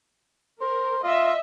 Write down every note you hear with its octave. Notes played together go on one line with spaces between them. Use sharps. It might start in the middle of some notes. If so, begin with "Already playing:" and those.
A#4 C5
F4 D#5 E5